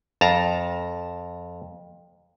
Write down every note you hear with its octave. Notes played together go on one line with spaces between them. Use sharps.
F2 A5 A#5